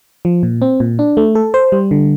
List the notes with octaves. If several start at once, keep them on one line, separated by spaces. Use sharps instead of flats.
F3
A#2
C4
A#2
D4
A3
A4
C5
G3
D3